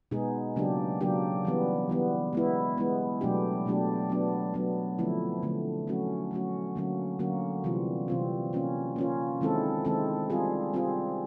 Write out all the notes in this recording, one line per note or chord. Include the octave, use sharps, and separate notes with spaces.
B2 G#3 B3 D#4 G#4
C#3 F#3 A#3 D4 G4
C#3 F#3 A#3 D4 G4
E3 G3 B3
E3 G3 B3
G#3 B3 E4
G#3 B3 E4
B2 F#3 A3 D4 G4
B2 F#3 A3 D4 G4
F#3 B3 D4
F#3 B3 D4
D3 F3 A3 C4 E4
D3 F3 A3 C4 E4
F#3 A3 C#4 F#4
F#3 A3 C#4 F#4
D3 F#3 A#3 C#4 F#4
D3 F#3 A#3 C#4 F#4
C3 E3 G3 C4 F4
C3 E3 G3 C4 F4
A#3 C#4 F4
A#3 C#4 F4
D#3 G#3 C4 E4 A4
D#3 G#3 C4 E4 A4
G3 C4 F4 G#4
G3 C4 F4 G#4